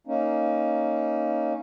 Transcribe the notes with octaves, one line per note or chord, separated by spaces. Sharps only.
A#3 C#4 D#4